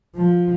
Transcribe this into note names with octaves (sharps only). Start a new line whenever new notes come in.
F3